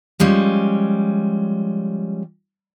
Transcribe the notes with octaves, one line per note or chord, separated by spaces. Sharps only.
F3 G3 G#3 C#4